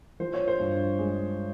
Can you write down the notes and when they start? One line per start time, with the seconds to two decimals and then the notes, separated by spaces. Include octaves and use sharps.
0.20 F3 C5
0.34 C#5
0.48 C5
0.60 G2
0.99 G#3